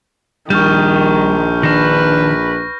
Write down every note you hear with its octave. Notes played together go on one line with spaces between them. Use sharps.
A#1 D#3 G3 C#6 F6 G6
D#3 D4 B4 A#6